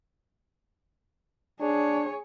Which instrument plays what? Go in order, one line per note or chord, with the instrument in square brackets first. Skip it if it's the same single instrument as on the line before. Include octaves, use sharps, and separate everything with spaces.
[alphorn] D4 [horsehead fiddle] G#4 C#5